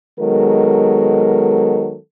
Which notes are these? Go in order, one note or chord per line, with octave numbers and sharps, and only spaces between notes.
D#3 F#3 G#3 B3 A4 A#4